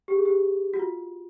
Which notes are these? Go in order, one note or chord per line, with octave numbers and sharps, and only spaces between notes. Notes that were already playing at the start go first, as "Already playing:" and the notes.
G4
G#4
G4
F#4
F4